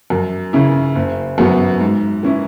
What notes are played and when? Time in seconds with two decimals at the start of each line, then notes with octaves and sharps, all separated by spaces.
0.10 F#2
0.53 C#3 E3 C#4 E4
0.96 F#1
1.38 F#2 F#3 B3
1.81 G#2
2.23 E3 C#4 E4